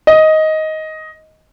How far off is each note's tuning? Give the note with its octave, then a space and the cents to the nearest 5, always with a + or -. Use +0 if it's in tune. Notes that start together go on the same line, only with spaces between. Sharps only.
D#5 +10